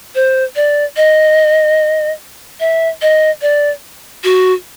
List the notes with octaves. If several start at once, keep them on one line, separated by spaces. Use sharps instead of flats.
C5
D5
D#5
E5
D#5
D5
F#4